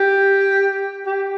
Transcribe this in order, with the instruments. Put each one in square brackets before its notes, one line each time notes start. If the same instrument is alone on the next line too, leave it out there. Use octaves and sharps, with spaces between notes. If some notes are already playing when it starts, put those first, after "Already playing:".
Already playing: [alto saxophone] G4
G4